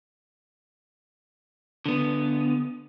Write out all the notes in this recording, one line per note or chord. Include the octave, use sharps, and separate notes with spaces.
D3 B3